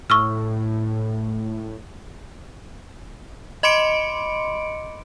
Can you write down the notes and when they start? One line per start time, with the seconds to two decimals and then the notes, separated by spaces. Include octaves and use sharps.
0.10 A2 C#6 E6 F6
3.63 D#5 B5 C6 D6 C#7 D7